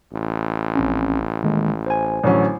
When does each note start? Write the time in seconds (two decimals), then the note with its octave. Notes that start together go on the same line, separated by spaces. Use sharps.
0.13 A1
0.75 A#1 C4 C#4
1.44 D#3 G#3 A#3
1.86 C5 G#5
2.24 A1 D3 F#3 C#4